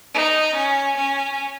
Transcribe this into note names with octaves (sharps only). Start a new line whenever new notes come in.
D#4
C#4
C#4